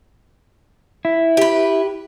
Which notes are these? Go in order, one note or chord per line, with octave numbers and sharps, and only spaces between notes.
E4
G4 B4